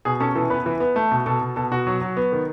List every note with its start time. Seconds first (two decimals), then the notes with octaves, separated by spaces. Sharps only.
0.05 B2 G#4
0.20 C#4 A4
0.35 E3 A4
0.50 B3 B4
0.66 E3
0.80 B3
0.96 A3
1.11 B2
1.26 B2 A4
1.41 B2
1.56 B2 A4
1.71 B2 F#4
1.87 F#3
2.01 F#3
2.17 B3
2.32 D#3